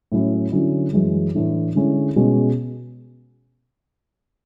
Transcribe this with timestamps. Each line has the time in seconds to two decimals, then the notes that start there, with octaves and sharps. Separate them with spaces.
0.12 A2 F#3 C#4 E4
0.52 D3 F#3 C#4 E4
0.93 F#2 E3 G#3
1.35 A2 E3 A3 D4
1.75 D3 G#3 C#4 E4
2.16 B2 G#3 C#4